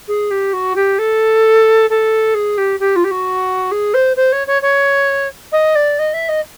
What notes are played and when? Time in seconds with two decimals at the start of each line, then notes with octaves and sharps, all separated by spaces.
0.08 G#4
0.31 G4
0.53 F#4
0.76 G4
0.99 A4
1.90 A4
2.35 G#4
2.58 G4
2.80 G4
2.96 F4
3.04 G4
3.11 F#4
3.72 G#4
3.94 C5
4.16 C5
4.32 C#5
4.47 C#5
4.62 C#5
5.52 D#5
5.75 D5
5.99 D#5
6.14 E5
6.29 D#5